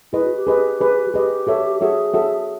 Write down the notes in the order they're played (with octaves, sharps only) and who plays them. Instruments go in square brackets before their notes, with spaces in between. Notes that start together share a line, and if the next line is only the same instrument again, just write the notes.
[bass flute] E4 [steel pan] G#4 B4 D#5
[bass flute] F#4
G4
[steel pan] G#4 B4 D#5
G#4 B4 D#5
[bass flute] F#4
[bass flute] G4 [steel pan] G#4 B4 D#5
[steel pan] F#4 A4 C#5 E5
[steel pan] F#4 A4 C#5 E5 [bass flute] G#4
[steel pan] F#4 A4 C#5 E5